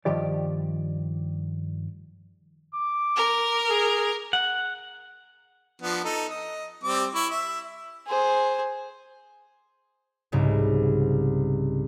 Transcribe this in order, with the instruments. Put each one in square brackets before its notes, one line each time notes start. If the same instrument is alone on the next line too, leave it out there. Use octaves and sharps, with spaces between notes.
[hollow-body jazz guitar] G2 D#3 F3 G4 D5
[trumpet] D6
[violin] A#4
[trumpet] G#4
[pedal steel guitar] F#5
[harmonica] F3 B3 D4
D#4 A4
D#5
G3 C4 D6
E4 C#6
E5
[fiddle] G#4 C5
[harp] C2 G#2 C#3